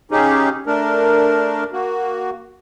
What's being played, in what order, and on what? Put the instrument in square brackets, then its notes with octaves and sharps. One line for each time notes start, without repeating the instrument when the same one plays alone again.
[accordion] C#3 C#4 D#4 G4 G#4
A3 D4 A#4
A#3 F#4